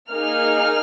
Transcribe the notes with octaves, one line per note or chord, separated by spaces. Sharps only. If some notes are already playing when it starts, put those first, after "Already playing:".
A#3 D#4 G#4 F6